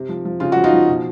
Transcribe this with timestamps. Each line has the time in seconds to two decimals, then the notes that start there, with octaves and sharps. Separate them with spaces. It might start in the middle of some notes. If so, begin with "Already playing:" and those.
Already playing: C3
0.09 F3
0.25 F3
0.40 C#3 F4
0.52 F3 F#4
0.64 D#4 F4
0.73 F3
0.88 B2